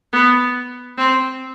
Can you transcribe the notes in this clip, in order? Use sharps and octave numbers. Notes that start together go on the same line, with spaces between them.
B3
C4